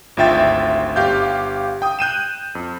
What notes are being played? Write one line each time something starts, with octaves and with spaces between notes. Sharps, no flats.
G#1 D2 F4 E5 G5 A6
G1 G4 F5 G6
G5 D#6
F#6 G6 D#7 E7
F2